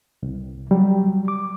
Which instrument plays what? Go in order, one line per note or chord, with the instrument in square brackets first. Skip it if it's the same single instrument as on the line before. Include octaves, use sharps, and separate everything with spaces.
[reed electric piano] C2
F#3 G3
D6